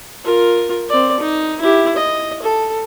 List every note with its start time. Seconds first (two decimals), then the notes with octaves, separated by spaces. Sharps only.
0.24 F4 A#4
0.89 C4 D5
1.20 D#4
1.61 E4 G4
1.96 D#5
2.42 A4